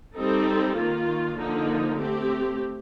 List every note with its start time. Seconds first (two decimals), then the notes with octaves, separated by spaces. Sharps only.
0.14 G3 C4 D#4 A4
0.76 D#3 A#3 F4
1.37 D3 F3 A#3 D#4
1.98 A3 C4 G4